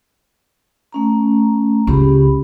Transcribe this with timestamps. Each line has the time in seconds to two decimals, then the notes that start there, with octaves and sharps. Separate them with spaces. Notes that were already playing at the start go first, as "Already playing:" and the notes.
0.93 A3 C#4 A#5
1.87 C#2 C#4 G4 B5